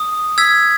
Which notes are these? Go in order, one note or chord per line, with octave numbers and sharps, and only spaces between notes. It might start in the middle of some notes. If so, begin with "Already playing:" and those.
Already playing: D#6
E6 G#6 B6